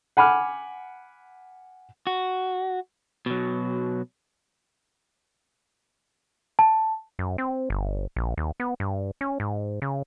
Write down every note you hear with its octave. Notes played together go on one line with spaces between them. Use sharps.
F#5 G#5 B5 D6 F6
F#4
B2 F#3
A5
F#2
C4
G1
A#1
D#2
B3
G2
C#4
G#2
C#3